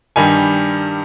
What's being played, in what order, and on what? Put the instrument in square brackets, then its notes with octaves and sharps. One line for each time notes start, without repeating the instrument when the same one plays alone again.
[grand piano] G2 D#3 G3 G#5